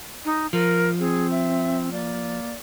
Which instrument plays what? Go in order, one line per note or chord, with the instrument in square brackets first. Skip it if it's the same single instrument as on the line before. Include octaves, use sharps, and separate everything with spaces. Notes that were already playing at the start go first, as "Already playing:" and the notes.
[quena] D#4
[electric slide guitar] F3 [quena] A#4
[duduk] C4 [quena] G#4
[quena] E5
[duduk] A#3 [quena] D5